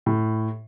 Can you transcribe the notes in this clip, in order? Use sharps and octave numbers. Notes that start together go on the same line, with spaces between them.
A2